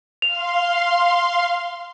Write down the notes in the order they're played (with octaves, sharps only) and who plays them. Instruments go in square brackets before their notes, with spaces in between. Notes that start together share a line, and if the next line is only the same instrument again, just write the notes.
[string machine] F5 C6 [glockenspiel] F7